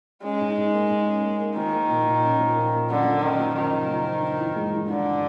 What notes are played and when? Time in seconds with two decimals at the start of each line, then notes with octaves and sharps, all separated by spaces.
0.23 G#3 C#4
0.40 G#2
0.56 G#2
0.73 A#3
0.90 G#2
1.06 C#4
1.23 A#3
1.40 A#3
1.56 D#3 F3
1.72 A#3
1.89 A#2
2.06 A#2
2.23 C#4
2.39 F3
2.56 A#2
2.73 A#3
2.89 F#2 D3
3.05 F3
3.22 F#2 D#3
3.39 F3
3.55 F#2 D#3
3.72 C#3
3.88 F3
4.06 F3
4.22 G2
4.38 E3
4.55 G#3
4.72 E3
4.89 G2 D3